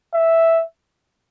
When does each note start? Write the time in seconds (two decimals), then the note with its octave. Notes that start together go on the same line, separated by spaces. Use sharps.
0.14 E5